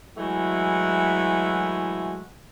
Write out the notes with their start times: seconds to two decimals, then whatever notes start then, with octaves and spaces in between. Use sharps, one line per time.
0.16 E3 F#3 G#3 A3 E4 F#4